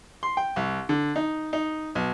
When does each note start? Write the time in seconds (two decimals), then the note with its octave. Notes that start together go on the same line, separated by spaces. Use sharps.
0.23 C6
0.37 G5
0.56 C2
0.89 D3
1.16 D#4
1.53 D#4
1.95 B1